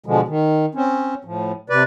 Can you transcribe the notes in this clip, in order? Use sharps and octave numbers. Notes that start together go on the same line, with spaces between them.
B2 D3 F3 G#3
D#3
C4 C#4
A2 F3
C3 B4 D5